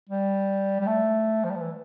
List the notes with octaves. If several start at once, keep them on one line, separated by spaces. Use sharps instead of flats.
G3
G3
A3
F3
G3
F3
E3